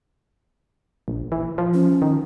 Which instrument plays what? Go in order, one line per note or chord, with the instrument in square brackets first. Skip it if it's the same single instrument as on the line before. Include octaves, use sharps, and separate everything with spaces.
[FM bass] A#1
E3
F3
[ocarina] C#4
[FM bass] D#3